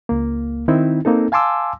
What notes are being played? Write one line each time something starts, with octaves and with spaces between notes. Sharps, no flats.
C#2 A#3
D#3 C4 D#4 E4
A#3 C4 D#4 A4
F5 G#5 A5 C6 D6 E6